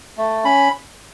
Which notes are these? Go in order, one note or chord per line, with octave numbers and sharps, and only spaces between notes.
A3
C#4 B5